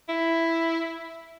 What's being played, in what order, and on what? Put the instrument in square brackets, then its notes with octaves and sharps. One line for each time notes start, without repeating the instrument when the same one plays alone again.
[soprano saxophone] E4